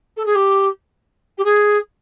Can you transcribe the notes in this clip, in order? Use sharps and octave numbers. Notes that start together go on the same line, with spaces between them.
A4
G#4
G4
G4
G#4